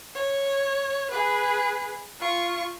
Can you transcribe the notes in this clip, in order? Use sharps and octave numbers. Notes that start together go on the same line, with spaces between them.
C#5
G#4 B4
F4 C#6